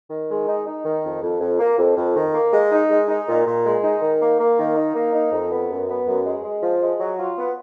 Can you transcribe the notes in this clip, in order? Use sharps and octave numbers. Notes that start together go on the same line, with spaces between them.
D#3
G#3
D#4
D#4
D#3
F2
F2
F2
A#3
F2
F2
D#3
A#3
G#3
D#4
G#3
D#4
A#2
A#2
G#3
D#4
D#3
A#3
A#3
D#3
D#4
A#3
D#4
F2
B3
F#2
B3
F#2
G#3
G#3
F3
G#3
F#3
F4
B3